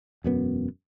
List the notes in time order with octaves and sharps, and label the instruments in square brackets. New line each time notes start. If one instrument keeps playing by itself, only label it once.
[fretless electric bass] E1 F#2 B3